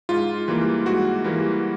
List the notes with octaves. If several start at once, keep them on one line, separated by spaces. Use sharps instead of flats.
G#2 F4
E3 G3 A#3
G#2 F#4
E3 G3 A#3